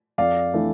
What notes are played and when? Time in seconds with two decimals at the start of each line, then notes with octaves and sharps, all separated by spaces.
0.18 F2 D5 F5
0.54 E3 A3 D4